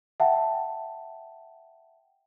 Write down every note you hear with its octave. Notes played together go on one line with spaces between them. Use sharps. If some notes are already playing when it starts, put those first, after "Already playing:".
E5 F#5 G5 A5